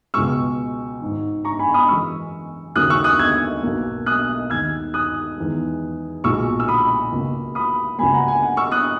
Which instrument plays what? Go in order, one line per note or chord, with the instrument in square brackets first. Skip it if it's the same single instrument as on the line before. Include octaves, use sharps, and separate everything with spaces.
[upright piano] C#2 B2 G#3 C#6 E6
G#1 G#2 D#3
A#5 C#6
G#5 B5
B5 D#6
F#2 E3 G#3 C#6 E6
D#2 C#3 F#3 A#3 D#6 F#6
C#6 E6
D#6 F#6
E6 G#6
B1 B2 A#3
D#6 F#6
D#2 D#3 G#3 E6 G#6
D#6 F#6
E2 D#3 G#3
B1 A#2 G#3 C#6 E6
E6
B5 D#6
C#2 C#3 F#3 A#3
B5 D#6
C#2 C#3 F#3 A#3 G#5 B5
F#5 A#5
G#5
F#5
C#6 E6
D#6 F#6